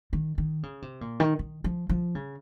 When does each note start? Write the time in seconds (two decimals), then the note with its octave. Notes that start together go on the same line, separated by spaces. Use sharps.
0.13 D#3
0.38 D#3
0.63 C#3
0.82 C3
1.01 A#2
1.20 D#3
1.39 D#3
1.64 F3
1.89 F3
2.15 C#3